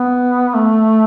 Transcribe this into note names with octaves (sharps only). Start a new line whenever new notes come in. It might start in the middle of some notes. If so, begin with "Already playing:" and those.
Already playing: B3
A3